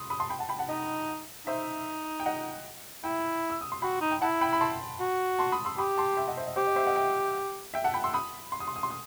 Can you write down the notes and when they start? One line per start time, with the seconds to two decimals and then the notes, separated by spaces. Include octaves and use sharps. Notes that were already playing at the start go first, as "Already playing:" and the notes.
Already playing: B5 C6 D#6
0.10 B5 D#6
0.20 A5 C6
0.30 G5 B5
0.39 F#5 A5
0.49 G5 B5
0.59 F#5 A5
0.69 D#4 D#5
1.47 D#4 C5 E5
2.20 G5
2.26 D#5 F#5
3.04 E4 E5 G5
3.50 E6
3.61 D#6
3.72 C6
3.82 F#4 G5 B5
4.01 D#4
4.11 G5
4.22 E4 F#5 A5
4.41 G5 B5
4.53 B5
4.61 A5 C6
5.00 F#4
5.39 A5 C6
5.52 B5 D#6
5.65 C6 E6
5.78 G4 B5 D#6
5.98 A5 C6
6.17 E5 G5
6.28 D#5 F#5
6.37 C5 E5
6.47 D#5
6.56 G4 C5
6.67 D#5
6.76 C5 E5
6.86 D#5 F#5
6.96 E5 G5
7.74 E5 G5
7.84 F#5 A5
7.94 G5 B5
8.04 C6 E6
8.14 B5 D#6
8.52 C6
8.60 D#6
8.68 C6
8.76 D#6
8.83 C6
8.90 D#6